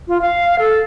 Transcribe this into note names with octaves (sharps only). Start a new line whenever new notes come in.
F4
F5
A4